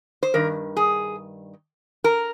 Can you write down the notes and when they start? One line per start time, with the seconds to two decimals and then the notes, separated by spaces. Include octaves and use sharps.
0.23 C5
0.34 G2 D#3 A#4
0.77 G#4
2.04 A#4